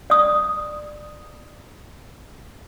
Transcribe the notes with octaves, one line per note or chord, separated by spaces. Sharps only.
D5 D#6